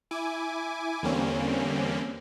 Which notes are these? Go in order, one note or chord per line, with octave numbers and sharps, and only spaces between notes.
E4 G#5 D6
E2 D3 G3 A#3 C4 C#4